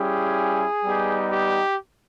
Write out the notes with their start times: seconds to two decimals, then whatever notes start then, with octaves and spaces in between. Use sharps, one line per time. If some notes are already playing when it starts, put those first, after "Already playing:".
Already playing: G3 C#4 E4 G4 G#4
0.85 G3 B3 D#4 G4
1.32 G4